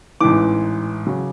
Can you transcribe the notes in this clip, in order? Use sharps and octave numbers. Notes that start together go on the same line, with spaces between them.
A1 G#2 E3 D6
C#3 F#3